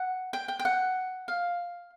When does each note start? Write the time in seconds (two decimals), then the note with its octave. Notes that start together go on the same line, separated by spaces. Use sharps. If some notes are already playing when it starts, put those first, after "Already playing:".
Already playing: F#5
0.33 G5
0.48 G5
0.59 G5
0.65 F#5
1.28 F5